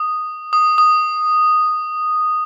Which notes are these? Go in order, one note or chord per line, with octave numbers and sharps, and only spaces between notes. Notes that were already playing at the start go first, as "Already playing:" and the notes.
Already playing: D#6
D#6
D#6